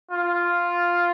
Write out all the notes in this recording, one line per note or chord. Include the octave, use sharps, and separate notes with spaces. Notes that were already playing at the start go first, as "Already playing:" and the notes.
F4